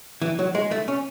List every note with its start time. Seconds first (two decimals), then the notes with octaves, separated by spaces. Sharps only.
0.22 E3
0.39 F#3
0.55 G#3
0.71 A3
0.88 C#4